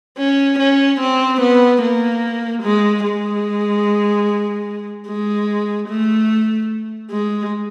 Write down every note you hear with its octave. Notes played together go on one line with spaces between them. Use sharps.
C#4
C#4
C4
B3
A#3
G#3
G#3
G#3
A3
G#3